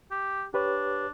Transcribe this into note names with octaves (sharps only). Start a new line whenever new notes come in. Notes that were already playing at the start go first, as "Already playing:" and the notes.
G4
D4 G4 B4 C#5